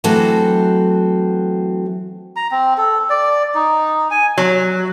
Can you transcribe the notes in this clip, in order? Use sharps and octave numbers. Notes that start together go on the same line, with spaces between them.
E3 F#3 A3 C4 F#4 A4
A#5
C4
A4
D5
D#4
G#5
F#3